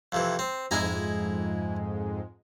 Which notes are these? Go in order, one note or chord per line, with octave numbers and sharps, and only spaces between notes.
F2 C3 E3
C4
F2 G#2 G#3 E4 G#5 A#5